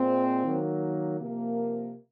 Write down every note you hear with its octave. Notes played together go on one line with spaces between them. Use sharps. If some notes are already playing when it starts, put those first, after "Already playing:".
Already playing: A#2 G#3 C4
D#3 F#3 A#3
C3 F3 A#3